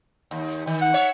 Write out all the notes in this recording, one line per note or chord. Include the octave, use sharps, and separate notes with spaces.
D#2
D#3
F#5
C#5 E5